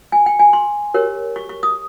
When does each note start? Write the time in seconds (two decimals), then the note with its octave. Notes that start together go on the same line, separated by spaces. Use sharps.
0.12 G#5
0.26 G5
0.39 G#5
0.53 C6
0.94 G4 A#4 C#5
1.36 C#6
1.49 C#6
1.63 D#6